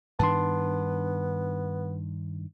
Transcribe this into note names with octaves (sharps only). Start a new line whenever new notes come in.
G2 D#3 B3 D4 A5 C6